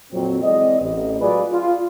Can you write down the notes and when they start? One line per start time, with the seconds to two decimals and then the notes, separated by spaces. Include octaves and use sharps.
0.12 F2 A#2 F#3 C4
0.42 E3 G#3 C4 D5 D#5
0.81 A1
1.21 F#3 G#3 F4 G#4 B4 D5
1.52 F4